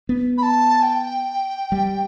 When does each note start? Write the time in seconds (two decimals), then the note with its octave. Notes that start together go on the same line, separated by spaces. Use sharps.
0.09 B3
0.38 B5
0.43 A5
0.83 G5
1.72 G3